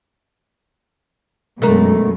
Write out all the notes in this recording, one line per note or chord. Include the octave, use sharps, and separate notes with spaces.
F#2 B2 G#3 A3 D4 A#4